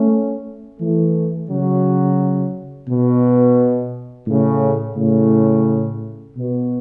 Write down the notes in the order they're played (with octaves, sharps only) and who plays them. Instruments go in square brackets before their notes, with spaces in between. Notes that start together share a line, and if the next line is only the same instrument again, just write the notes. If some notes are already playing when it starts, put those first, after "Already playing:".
Already playing: [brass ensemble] A3 C#4
E3 A3
C#3 F#3
B2
A2 C#3
A2 C#3
B2